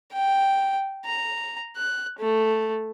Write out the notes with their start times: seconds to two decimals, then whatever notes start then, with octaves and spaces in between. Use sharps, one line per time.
0.13 G5
1.05 A#5
1.77 F#6
2.19 A3